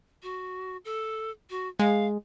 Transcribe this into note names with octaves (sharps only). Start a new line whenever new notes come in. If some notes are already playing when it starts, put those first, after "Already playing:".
F#4
A4
F#4
G#3 F5